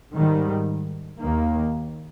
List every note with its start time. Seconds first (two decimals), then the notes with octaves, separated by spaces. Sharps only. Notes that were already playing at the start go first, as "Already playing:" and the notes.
0.13 G#2 D#3 G3
1.20 D#2 D#3 A#3